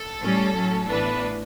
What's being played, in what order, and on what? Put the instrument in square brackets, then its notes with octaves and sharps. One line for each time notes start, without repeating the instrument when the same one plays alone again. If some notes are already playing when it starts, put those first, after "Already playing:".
Already playing: [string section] A4
A2 G3 C#4
A2 F#3 C#4
A1 A2 E3 B3 D4 B4